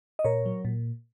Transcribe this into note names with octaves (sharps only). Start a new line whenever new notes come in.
D#5
A#2 A#4 C#5
F#3
A#2